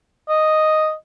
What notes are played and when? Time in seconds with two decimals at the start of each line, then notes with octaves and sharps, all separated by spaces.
0.29 D#5